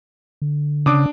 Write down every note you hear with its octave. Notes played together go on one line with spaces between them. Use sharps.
D3
C#3 D4 D6 D#6